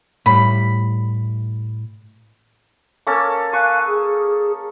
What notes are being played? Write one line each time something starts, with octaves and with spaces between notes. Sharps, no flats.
A2 G3 B5
A#3 C#4 A4
F5 G#5 C#6 F#6
G#4